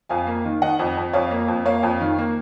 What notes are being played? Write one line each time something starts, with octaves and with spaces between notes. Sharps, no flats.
F2 F5 G#5
A#3
D#3
D#3 D#5 F#5
F2
F2
F2 C#5 F5
A#3
F2
A#3 C#5 F5
F2
D#3
A#3